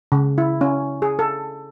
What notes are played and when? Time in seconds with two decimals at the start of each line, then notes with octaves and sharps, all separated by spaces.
0.12 C#3
0.38 E4
0.61 C#4
1.02 G#4
1.19 A4